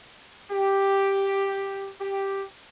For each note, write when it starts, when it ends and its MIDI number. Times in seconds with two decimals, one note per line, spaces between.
0.51 1.88 67
2.01 2.43 67